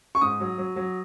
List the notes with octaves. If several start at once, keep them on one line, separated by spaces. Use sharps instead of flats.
C#6
G#2 D#6
F#3
F#3
F#3